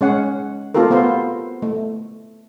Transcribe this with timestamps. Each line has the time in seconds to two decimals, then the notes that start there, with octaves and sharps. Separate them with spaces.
0.01 G#3 C#4 F#5
0.74 A3 C4 F4 G4 A4 A#4
0.91 B3 F4 C5
1.62 A3